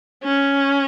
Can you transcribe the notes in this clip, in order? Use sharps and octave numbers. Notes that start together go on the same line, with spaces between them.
C#4